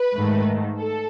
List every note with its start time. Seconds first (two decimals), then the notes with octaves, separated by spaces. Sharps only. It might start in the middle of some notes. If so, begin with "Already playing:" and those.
Already playing: B4
0.15 G#2 D#3 A3
0.79 A4